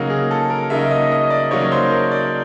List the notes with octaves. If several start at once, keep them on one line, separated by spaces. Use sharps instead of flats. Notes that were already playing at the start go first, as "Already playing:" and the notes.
Already playing: C#3 F#3 A#3 D#4
G#4
A4
A#4
C#3 F#3 A#3 D#4 E5
D#5
D#5
D5
C#3 F#3 A#3 D#4 C#5
C5
A#4
D5